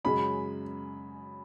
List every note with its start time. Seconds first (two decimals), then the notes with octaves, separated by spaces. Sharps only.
0.04 F#2 C#3 G#3 B5